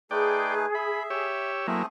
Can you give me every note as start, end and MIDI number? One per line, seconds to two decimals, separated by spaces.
0.11 0.66 57
0.11 0.66 63
0.11 1.25 68
0.11 0.66 71
0.11 0.55 74
0.11 0.55 79
0.75 1.51 76
0.75 1.03 83
1.10 1.67 67
1.10 1.67 73
1.10 1.67 88
1.68 1.83 54
1.68 1.86 57
1.68 1.83 58
1.68 1.86 60
1.68 1.83 64
1.68 1.86 68